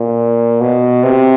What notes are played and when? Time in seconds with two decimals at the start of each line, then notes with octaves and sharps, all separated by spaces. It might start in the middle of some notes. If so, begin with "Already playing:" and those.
Already playing: A#2
0.61 B2
1.04 C3